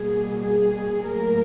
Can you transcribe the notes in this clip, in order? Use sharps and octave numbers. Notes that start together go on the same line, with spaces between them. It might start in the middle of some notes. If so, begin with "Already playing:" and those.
Already playing: B2 G3 A#3 G#4
G#4
A2 F#3 A#3 A#4